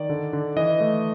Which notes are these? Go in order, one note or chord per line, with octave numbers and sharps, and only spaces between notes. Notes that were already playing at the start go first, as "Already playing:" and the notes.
Already playing: D#3 D5
D3
D3
E3 D#5
A3